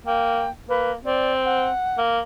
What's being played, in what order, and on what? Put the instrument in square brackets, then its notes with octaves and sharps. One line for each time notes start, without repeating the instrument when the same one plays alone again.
[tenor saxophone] A#3 [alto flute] G5
[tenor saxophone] A#3 [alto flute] B4
[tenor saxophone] C4 [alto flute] D5
[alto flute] F#5
[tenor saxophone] A#3